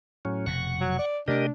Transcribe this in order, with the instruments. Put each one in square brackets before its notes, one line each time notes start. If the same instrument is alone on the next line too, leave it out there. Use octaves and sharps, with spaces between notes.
[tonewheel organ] A2 F#3 C#4
[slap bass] F1 B2 [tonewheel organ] F#5 C#6
[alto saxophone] F#3
D5
[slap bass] C3 A3 [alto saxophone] D4 [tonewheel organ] G4 A#4 D#5